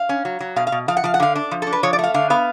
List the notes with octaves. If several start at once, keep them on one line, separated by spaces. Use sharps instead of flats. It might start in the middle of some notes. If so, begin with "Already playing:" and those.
Already playing: F5
C#4
F#3
F#3
B2 F5
F5
B2
F3 F5
F#5
F3 F5
F#5
D3 F5
D4
F3
D4 A4
B4
F3 C#5
D5
A3 F5
D3 F5
B3 F5